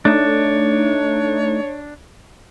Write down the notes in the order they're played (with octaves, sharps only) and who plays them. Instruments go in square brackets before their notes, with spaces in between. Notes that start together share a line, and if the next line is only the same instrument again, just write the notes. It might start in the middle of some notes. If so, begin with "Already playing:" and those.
[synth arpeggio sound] A3 D#4 [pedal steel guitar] D4 [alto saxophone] C#5